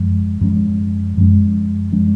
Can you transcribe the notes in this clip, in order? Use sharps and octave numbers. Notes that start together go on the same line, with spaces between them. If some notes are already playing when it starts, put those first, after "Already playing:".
Already playing: F#2 F3 G#3
F#2 F3 G#3 C#4
F#2 F3 G#3 C#4
F3 G#3 C#4